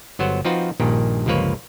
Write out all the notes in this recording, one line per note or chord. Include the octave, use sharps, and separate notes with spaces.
G1 F#3 B3 C5 F#5
F3 C4 D#4 F4 F#4 B4
A#1 G2 A#2 D#3
G1 C#2 F3 A#3 B4 C#5